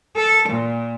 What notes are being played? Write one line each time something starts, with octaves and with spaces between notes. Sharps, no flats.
A4
A#2